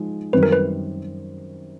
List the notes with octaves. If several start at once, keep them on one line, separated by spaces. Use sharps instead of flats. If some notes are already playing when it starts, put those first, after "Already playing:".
Already playing: F3 G#3 D#4
F#2 D#3 G3 C4 B4
A#4
B4